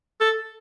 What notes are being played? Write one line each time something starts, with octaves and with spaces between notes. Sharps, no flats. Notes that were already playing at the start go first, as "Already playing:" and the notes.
A4